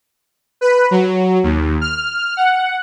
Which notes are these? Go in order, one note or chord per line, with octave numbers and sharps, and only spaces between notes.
B4
F#3
D#2
F6
F#5